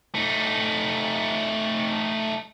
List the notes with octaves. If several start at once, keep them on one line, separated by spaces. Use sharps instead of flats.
A3 D#4